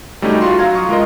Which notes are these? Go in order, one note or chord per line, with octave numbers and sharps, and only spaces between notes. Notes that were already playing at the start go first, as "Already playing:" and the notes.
G3 A3 C#4 D#4 F#4
F4 F#4 C6
F#3 F5 A#5 G#6
C#6 D#6
G#3 F4 A#4 D#5